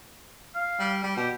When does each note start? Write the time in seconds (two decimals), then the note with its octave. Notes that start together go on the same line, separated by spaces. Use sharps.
0.55 F5
0.80 G3
1.04 G3
1.17 B2 G4